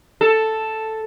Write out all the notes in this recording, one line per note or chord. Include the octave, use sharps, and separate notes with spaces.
A4